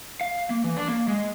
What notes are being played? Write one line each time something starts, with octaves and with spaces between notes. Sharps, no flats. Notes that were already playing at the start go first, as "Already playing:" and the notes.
F5
A#3
E3
D4
A#3
G#3